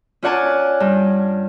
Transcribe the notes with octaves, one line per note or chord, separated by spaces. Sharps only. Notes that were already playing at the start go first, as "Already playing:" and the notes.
C#4 F4 D5 F#5 G#5 A5
G2